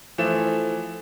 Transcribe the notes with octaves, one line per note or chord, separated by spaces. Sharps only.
E3 F3 A3 E7